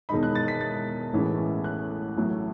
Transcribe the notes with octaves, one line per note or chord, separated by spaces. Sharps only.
E1 E2 D#3 G#3 D#4 B5
F#6
A6
B6
A6
A1 A2 E3 G#3 C#4
F#6
A1 A2 F#3